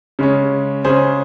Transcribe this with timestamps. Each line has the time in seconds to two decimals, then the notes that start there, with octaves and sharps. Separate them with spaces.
0.19 C#3 G#3 C#4
0.85 C#3 G#3 C#4 G#4 C5